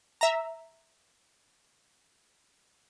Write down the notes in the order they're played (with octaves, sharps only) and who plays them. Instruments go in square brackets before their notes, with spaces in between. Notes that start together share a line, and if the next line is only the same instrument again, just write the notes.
[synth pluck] E5 A#5